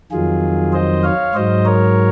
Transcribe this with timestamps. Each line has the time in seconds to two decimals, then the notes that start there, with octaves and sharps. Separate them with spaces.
0.11 F2 D#3 F#3 F4 G#4
0.73 C5 D#5
1.04 C#5 F5
1.34 G#2 F#3 C5 D#5
1.65 A#4 C#5